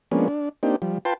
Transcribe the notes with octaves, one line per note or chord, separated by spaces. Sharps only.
F3 G#3 A#3 B3 C#4 D4
D4
A#3 C4 D4 D#4 G4
F3 G3
F4 B4 G5 A5 C6